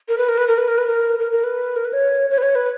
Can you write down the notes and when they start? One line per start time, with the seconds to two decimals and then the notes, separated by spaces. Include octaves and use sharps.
0.09 A#4
0.18 B4
0.28 A#4
0.38 B4
0.48 A#4
0.58 B4
0.68 A#4
0.78 B4
0.87 A#4
1.19 A#4
1.32 A#4
1.44 B4
1.76 A#4
1.85 B4
1.93 C#5
2.30 C#5
2.38 B4
2.42 C#5
2.55 B4